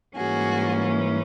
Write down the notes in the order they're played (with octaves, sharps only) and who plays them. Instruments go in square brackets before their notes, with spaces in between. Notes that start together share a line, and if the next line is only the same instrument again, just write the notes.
[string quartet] G#2 E3 G3 A#3 C#4 F#4 G#4